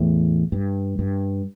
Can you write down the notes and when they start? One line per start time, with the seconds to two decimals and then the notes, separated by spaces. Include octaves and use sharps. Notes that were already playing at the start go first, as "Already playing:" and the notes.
Already playing: E2 A2
0.52 G2
0.99 G2